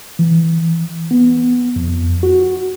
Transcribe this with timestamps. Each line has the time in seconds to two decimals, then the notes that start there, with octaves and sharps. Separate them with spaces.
0.19 E3
1.11 B3
1.76 F2
2.23 F#4